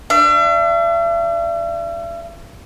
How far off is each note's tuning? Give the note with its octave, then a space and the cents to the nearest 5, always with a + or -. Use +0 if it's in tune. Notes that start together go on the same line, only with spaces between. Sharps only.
D4 +15 E5 +45